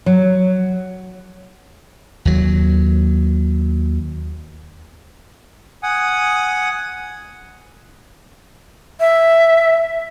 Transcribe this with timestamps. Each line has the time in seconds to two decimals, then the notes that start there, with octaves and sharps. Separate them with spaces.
0.06 F#3
2.25 D#2 F#3
5.83 F#5 G#5 D#6
9.00 E5